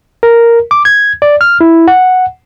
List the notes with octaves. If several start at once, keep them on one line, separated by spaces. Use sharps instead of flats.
A#4
D6
G#6
D5
F6
E4
F#5